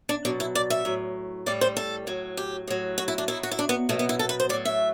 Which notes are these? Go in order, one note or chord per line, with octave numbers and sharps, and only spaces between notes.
D4
B2 F#3 D4
E4
D5
E5
A2 F#3
A2 G3 D5
C5
A4
A2 F#3
G4
A2 F#3
F#4
E4
D4
B2 F#3 E4
F#4
E4
D4
B3
B2 F#3 A3
B3
E4
A4
B4
C5
A2 F#3 D5
E5